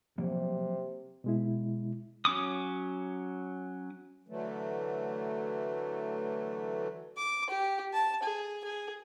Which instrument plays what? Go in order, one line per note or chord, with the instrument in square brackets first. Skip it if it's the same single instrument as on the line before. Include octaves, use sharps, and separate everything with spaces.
[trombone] C3 [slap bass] F3 F#3 A#3
[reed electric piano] B2 G#3 E4
[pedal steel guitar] F#3 C#4 D6 D#6
[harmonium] D3 E3 F#3 A3
[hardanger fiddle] D6
G4
A5
G#4
G#4